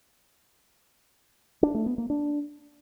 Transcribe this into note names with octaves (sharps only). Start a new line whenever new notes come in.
D4
A3
B3
A#3
D4